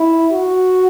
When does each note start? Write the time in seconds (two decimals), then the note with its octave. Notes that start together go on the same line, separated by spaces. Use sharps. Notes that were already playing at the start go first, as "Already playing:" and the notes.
Already playing: E4
0.32 F#4